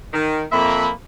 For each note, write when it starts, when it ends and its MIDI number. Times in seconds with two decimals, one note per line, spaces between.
0.13 0.41 51
0.52 0.87 41
0.52 0.92 58
0.52 0.87 76
0.52 0.92 83